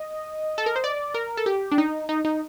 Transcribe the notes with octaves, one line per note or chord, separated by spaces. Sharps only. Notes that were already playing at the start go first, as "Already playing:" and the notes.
Already playing: D#5
A4
A#4
C5
D5
A#4
A4
G4
D4
D#4
D#4
D#4